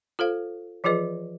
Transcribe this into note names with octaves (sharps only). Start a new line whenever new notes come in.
F4 A4 C5 F5
E3 F3 F4 G#4 B4 D#5